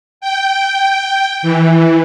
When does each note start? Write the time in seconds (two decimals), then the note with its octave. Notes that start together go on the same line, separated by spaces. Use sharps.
0.21 G5
1.42 E3